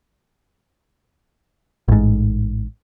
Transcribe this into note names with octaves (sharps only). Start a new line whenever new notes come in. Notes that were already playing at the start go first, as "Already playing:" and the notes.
A1 G#2